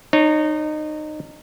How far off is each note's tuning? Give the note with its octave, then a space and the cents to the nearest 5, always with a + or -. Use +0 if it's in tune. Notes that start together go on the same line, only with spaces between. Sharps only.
D#4 -25 C#5 +0